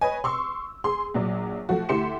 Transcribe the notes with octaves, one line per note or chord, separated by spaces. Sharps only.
B4 C#5 D#5 G#5
C6 C#6 E6
G#4 C6
A#1 F#3 D5
F3 A3 F#4
D2 E4 G4 C6 C#7 E7